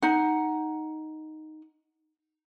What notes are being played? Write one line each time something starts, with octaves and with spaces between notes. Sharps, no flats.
D#4 F#5